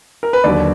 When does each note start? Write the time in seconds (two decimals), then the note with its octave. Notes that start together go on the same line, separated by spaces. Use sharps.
0.23 A#4
0.33 B4
0.44 D#2 D3 F#3 D5